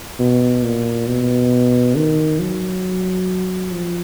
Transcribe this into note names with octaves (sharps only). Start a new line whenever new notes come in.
B2
A#2
B2
D#3
F#3
F3